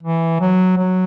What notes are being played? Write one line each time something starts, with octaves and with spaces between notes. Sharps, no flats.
E3
F#3
F#3